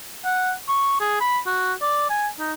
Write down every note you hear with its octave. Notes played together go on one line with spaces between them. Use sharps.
F#5
C#6
G#4
B5
F#4
D5
G#5
D#4